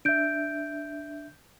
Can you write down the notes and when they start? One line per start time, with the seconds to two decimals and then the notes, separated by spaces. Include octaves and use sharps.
0.05 D4 E5 G6 D7